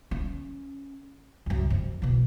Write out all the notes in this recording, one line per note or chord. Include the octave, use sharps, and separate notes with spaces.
C#4
C#2 F#2
F2
B2 E3